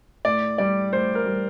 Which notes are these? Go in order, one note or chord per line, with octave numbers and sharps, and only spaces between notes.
A2 D5
G3 D5
A2 C5
A#4
G3